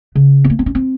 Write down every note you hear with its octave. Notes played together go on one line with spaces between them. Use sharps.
C#3
C4
A#3
C4
C#4
C4